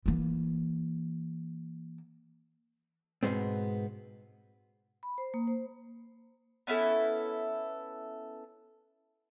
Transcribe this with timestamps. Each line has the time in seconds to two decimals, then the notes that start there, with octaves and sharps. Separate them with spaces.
0.06 E3 A#3
3.23 G#2 B2 E3 G#3 B3 C4
5.03 B5
5.18 C5
5.34 A#3
5.48 C5
6.67 B3 C#4 E4 A4